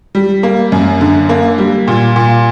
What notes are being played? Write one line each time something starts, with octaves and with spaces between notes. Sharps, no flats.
G3
A#3
F#2
D3
A#3
G3
A#2
A#2